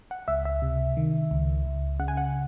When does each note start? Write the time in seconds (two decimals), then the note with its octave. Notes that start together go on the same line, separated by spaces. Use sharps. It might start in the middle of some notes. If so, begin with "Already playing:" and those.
0.11 F#5
0.28 C#2 E5
0.45 E5
0.62 C3
0.97 D#3
1.31 C#2
1.65 C#2
1.99 C#3 F#5
2.08 G#5
2.17 F#5